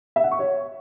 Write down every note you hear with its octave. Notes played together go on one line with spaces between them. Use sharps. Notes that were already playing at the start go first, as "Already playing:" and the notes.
E5
F#5
C#6
C#5